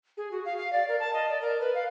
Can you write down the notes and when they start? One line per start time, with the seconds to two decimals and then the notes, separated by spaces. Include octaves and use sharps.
0.17 G#4
0.31 F#4
0.45 F5
0.57 F5
0.73 D5
0.88 A#4
1.00 A5
1.13 D#5
1.29 D5
1.41 A#4
1.60 B4
1.75 F5